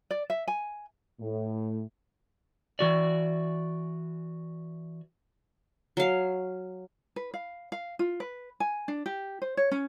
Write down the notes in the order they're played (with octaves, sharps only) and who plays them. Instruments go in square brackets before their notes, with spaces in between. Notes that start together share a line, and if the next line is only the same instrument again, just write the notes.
[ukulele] D5
E5
G#5
[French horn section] A2
[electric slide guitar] E3 F#4 D5
[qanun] F#3 F5
[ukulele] B4
F5
F5
F4
B4
G#5
D4
G4
C5
C#5
C#4